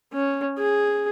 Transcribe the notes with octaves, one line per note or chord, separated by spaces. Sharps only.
C#4
G#4